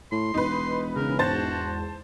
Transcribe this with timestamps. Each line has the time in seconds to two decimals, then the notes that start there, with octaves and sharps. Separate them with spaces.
0.12 A2 C6
0.34 E1 D#4 B4
0.96 C#3 A#4
1.19 E2 G#2 F#4 C5 A5 A6